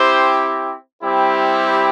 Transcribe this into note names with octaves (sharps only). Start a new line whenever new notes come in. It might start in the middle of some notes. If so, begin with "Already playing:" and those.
Already playing: C4 E4 G4 C5
G3 C4 E4 G4